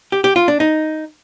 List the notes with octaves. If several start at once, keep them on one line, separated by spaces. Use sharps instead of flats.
G4
G4
F4
D4
D#4